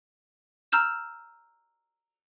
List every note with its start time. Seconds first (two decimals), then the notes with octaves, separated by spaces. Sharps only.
0.72 A#5 E6 F6 G6 E7